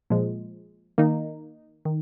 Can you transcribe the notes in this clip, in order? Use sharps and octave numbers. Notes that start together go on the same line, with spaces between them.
A#2 F3 G#3
D#3 A#3 D#4
D#3